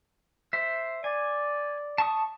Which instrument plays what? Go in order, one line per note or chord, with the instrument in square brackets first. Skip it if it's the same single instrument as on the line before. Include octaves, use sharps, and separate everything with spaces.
[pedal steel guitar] C5 E5
[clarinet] D5 [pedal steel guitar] G#5
[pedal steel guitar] A5 C#6 D#6